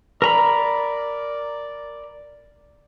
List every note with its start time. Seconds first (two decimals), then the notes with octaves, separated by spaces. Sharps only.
0.22 A#4 D5 A#5 B5